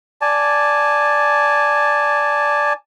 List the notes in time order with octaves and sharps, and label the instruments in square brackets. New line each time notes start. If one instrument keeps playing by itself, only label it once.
[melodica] D5 G#5 A5